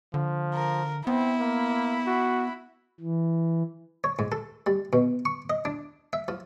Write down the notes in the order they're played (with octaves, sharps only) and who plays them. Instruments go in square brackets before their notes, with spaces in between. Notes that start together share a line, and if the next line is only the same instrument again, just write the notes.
[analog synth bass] D3 [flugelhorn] F3
[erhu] A#4
[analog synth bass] B3 [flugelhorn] C4 [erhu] E4
[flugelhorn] A#3
F#4
[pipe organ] E3
[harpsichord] C#5
G#2
A4
G3
B2
C#6
D#5
D4
E5
F3